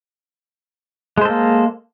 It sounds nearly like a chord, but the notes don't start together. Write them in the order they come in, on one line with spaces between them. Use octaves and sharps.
G#3 C5 A4 A#3